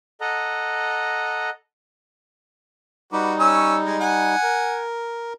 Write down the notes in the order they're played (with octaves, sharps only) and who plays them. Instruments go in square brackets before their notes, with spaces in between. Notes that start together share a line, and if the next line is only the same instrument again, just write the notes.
[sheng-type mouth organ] A4 D#5 F#5 A#5
[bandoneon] G3 D#4 [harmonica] F#4 B4 D6
[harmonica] C#4 C#5 E6
G#3
F#5 G#5
[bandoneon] A#4